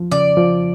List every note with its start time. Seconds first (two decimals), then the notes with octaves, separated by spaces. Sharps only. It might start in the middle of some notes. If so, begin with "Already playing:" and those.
Already playing: F3
0.12 C#3 D5
0.37 F3